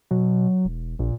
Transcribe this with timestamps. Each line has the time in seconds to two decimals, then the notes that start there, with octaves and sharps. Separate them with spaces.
0.11 B2 F#3
0.64 E1
0.99 A#1 A#2